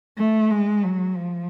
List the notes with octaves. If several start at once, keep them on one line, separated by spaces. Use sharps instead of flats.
A3
G#3
F#3
F3